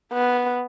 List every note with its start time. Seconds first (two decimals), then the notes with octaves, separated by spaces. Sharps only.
0.13 B3